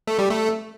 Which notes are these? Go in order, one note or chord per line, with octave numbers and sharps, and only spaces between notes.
A3
G3
A3